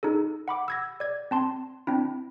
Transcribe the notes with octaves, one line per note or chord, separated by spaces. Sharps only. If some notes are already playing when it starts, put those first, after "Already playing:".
D#4 G#4 A4
F#5 B5 D6
E6 G#6 A#6
D5 G#6
C4 A5 C6
C4 D4 E4